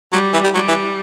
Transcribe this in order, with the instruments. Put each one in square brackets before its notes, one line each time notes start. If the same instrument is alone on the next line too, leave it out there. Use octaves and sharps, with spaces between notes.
[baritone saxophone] F#3 [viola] G3
[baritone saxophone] E3
G3
[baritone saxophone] F#3 [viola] G3
[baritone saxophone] E3